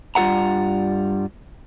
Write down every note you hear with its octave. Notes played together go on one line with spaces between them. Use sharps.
G2 G3 F4 A4 F#5 A#5